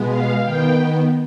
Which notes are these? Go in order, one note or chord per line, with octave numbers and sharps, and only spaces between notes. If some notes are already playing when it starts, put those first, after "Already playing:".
Already playing: B2 G#3 B3
F5
D#3 B3 G5